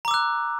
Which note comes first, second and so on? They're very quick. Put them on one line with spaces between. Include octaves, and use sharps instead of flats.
A#5 D6 E6 F#6